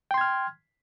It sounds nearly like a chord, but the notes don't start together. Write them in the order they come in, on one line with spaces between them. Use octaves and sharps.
G5 C6 G#6 F6